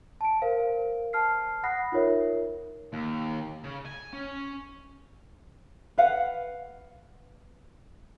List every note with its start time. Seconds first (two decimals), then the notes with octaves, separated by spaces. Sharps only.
0.21 A5 D7
0.42 A#4 C5 F5
1.13 A5 F6 C7
1.63 F#5 B5 D#6 F#6 A#6 C7
1.92 D#4 F4 A#4 C#5 E5
2.93 D#2
3.64 C#3
3.85 G#5
4.13 C#4
5.98 B4 F5 F#5